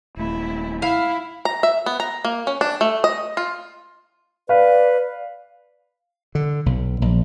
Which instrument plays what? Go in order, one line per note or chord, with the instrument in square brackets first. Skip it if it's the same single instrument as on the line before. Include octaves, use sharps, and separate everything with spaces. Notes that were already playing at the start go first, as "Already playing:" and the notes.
[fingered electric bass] D#1 A3 [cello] E4
[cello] E4 [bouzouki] F5
[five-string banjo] A#5
E5
B3
A#5
A#3
C#4
D4
A3
D#5
F4
[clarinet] B4 [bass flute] D5 [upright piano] F5
[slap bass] D3
B1
A#1